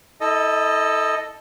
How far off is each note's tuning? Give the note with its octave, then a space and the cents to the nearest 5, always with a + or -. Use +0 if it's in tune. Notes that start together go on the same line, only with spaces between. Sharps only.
E4 -40 A4 +0 D#5 -5